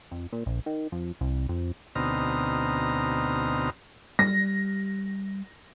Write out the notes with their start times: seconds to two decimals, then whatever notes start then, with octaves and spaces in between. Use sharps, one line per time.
0.11 F2
0.33 A#2
0.46 A#1
0.66 D#3
0.92 F2
1.21 C2
1.49 F2
1.95 D2 B2 C4 D#4 A#5 F6
4.19 G3 A#6